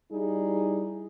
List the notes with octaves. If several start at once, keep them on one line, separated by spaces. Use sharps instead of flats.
G3 D#4 E4 G#4